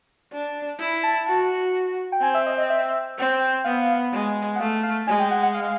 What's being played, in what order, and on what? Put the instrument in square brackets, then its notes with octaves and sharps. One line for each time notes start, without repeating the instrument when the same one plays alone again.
[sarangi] D4
E4
[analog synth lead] A5
[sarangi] F#4
[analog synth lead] G5
[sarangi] C4 [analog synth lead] G#5
[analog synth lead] E5
D#5
D#5
E5
[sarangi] C4
[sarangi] B3 [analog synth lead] F5
[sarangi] G#3
[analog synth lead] F#5
[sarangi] A3 [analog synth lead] F5
[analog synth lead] F5
[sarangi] G#3 [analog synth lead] G#5
[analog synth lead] G5
F#5
F#5
F5